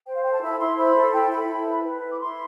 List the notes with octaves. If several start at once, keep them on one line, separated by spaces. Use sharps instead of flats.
C5 G5
F5
A4 G5
A5
E4 B5
E4 C6
C5 B5
A4
E4 G5
E4 B5
E4
B4
B4
E4
D6
E4 C6